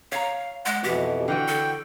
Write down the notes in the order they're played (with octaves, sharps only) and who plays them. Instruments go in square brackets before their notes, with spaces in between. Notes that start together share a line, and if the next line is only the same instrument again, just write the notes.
[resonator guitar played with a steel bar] C#5 A#5 [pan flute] F5
[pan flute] G#3 [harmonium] F#5
[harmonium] F2 B2 E3 [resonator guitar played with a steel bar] F#4 [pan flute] G4
[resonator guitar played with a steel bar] D3 E3 F#4 [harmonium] G5
[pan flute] A4